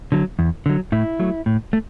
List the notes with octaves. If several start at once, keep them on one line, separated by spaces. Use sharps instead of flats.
D3 F#3
E2
D3 F#3
A2 E4
F#3 A3
A2
A3